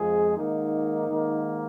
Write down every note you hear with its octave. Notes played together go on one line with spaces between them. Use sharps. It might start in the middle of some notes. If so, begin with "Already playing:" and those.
Already playing: F2 F3 G#3 G#4
G#2 D#3 A#3 D#4
G#2 D#3 A#3